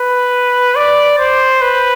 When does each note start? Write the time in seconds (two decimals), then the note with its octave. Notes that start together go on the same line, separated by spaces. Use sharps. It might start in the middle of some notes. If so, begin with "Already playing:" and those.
Already playing: B4
0.77 D5
1.19 C5
1.62 B4